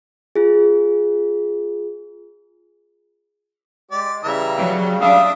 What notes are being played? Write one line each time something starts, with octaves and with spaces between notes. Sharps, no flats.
F4 G#4
G#3 G4 D5
C#3 E3 G3 E5 A#5
F#3
D4 E5 F5 D#6